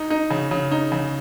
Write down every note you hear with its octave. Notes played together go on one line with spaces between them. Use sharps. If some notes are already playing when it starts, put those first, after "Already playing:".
Already playing: D#4
D#4
C#3
C#3
D#4
C#3